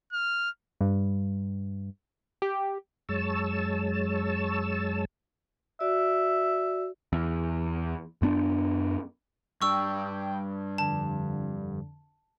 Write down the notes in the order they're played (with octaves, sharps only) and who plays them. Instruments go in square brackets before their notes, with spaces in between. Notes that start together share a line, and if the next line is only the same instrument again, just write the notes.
[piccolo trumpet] F6
[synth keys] G2
G4
[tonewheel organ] F#2 G#3 C#5 A5 E6
[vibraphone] F#4 D5 [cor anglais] E5
[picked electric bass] E2
F#2 B3 D4
[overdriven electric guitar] G2 D4 [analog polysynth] G5 [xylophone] C#6 E6
[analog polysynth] F2 D3 [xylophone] A5